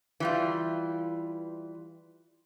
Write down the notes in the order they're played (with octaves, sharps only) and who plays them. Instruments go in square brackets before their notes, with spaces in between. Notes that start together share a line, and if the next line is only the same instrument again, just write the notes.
[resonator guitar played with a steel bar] E3 G3 F4